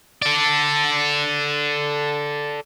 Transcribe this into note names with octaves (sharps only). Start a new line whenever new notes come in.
A4 D5